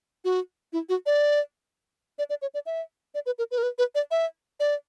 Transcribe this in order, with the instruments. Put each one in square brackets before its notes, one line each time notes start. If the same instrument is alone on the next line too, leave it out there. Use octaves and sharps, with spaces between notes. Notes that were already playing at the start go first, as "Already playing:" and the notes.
[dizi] F#4
E4
F#4
D5
D5
D5
C#5
D5
E5
D5
B4
A#4
B4
A#4
B4
B4
D5
E5
D5